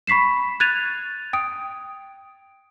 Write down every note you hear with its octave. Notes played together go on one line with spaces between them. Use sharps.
B5 C#6 B6 C7 E7
F#6 G#6 A6 D#7 F7
G5 D#6 D7